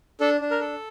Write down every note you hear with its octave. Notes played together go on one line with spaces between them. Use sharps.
D4 A4
D4
A#4
A4